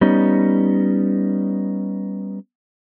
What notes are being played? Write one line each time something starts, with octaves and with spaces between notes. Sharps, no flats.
G3 B3 C#4 D#4